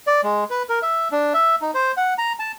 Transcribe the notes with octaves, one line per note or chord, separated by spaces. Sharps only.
D5
G#3
B4
A#4
E5
D4
E5
D#4
C5
F#5
A#5
A5